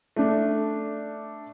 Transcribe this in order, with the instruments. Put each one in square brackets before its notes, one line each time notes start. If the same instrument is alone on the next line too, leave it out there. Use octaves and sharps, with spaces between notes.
[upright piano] A3 D4